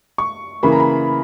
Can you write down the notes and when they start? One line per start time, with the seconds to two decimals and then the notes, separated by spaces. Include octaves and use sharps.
0.18 C#6
0.63 C#3 E3 A#3 B5
0.72 A#5
0.80 B5